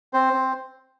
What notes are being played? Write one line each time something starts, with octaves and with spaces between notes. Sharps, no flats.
C4 C5
C4